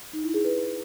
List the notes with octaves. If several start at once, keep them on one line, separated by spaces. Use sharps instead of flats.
D#4
E4
G#4
B4